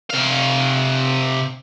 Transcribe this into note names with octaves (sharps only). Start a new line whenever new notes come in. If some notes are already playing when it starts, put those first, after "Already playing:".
C3 F5